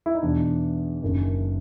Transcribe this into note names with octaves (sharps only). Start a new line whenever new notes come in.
E4
D#4
E2 B2 D4
F#1 F#2 D#3